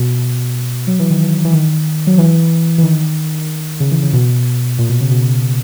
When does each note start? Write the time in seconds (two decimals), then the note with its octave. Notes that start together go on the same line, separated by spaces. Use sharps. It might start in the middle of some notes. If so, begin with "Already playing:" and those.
Already playing: B2
0.87 F#3
0.99 E3
1.10 D#3
1.22 E3
1.45 E3
1.53 D#3
2.07 F#3
2.18 E3
2.78 E3
2.83 D#3
3.80 C#3
3.91 E3
4.02 C#3
4.13 B2
4.78 A#2
4.89 B2
5.00 C#3
5.11 B2